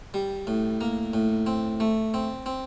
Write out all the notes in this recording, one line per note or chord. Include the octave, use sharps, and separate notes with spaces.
G3
A2
A#3
A2
C4
A3
C4
C4